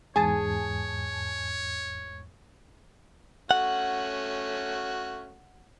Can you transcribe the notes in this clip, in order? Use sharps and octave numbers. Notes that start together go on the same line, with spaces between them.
E2 G#2 G#4 C#5 G#5 A5
A3 C#4 F#4 F#5